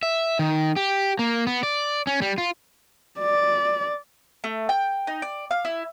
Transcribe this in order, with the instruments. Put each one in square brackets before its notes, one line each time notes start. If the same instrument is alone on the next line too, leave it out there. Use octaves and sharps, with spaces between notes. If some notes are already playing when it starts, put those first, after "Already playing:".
[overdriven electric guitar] E5
D#3
G4
A#3
B3
D5
C#4
G3
F4
[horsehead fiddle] D5
[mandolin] A3
G5
D#4
D5
F5
E4